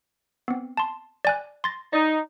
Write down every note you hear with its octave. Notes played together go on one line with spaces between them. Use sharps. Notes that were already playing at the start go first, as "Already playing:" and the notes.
B3 C4
A5 C6
D5 G#5 F#6
C6 A6 A#6
D#4 D5